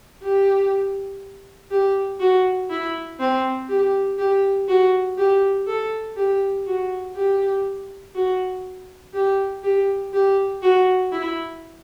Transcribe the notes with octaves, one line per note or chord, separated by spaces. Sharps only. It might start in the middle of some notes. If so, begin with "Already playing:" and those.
G4
G4
F#4
E4
C4
G4
G4
F#4
G4
A4
G4
F#4
G4
F#4
G4
G4
G4
F#4
E4